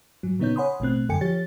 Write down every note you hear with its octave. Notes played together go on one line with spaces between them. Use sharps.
G#2 F#3
A#2 C#3 B3 D#4 C#5 G6
C#5 F#5 G#5 B5 C6 D#6
A1 B2 A3 C4 F#6
F#2 D3 A4 G5 G#5 C#7
F3 G4 C#5 A6